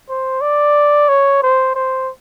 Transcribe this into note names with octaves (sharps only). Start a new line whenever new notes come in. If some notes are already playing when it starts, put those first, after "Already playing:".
C5
D5
C#5
C5
C5